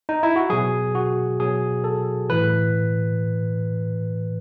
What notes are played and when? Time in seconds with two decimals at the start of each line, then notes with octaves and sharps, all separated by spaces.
0.09 D#4
0.23 E4
0.36 F#4
0.50 B2 F#3 G#4
0.95 F#4
1.39 B2 F#3 G#4
1.84 A4
2.29 A2 E3 B4